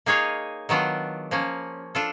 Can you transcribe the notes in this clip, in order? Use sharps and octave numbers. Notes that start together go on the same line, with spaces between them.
A#3 D#4 G#4 C#5 F5
D#3 F#3 B3 D4 F4
F3 A#3 C#4
D4 F4 A4